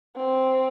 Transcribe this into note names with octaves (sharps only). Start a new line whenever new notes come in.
C4